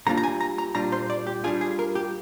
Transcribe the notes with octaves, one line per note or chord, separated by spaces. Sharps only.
D3 G3 A#3 D4 F4 A#5
A#5
G#5
A#5
A#5
A#2 G3 D4 F4 A#5
C5
D5
G4
G3 D4 F4 G#4
G#4
A#4
G4